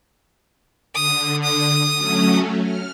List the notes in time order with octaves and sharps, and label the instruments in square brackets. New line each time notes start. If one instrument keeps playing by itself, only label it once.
[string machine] D3 [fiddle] D#6
[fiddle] D#6
[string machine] F#3 A3 C#4
F6